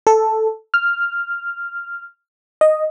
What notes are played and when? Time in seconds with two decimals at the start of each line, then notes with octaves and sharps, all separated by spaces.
0.07 A4
0.74 F6
2.61 D#5